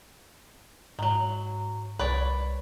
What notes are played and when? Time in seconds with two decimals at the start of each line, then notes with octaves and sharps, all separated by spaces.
0.99 G#2 D#3 F#3
1.99 C2 B4 C#5 D5